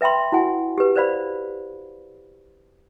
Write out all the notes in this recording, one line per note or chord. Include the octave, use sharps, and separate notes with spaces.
B4 E5 G5 B5 C6
E4 F#4 F#5 G#5
G4 B4
B4 C5 D5 F5 B5